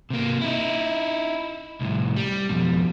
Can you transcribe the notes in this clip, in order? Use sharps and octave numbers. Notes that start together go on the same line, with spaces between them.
C3 A#3
D#4 E4
C2 A2
G3
F2 B2